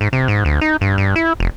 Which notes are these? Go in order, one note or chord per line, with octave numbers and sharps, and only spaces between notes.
G#2
C3
G#2
D2
D#4
G2
G2
E4
F1